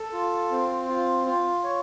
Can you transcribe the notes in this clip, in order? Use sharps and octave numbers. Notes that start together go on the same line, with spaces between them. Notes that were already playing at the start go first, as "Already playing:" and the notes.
Already playing: A4
F4
C4
F4
F4
C#5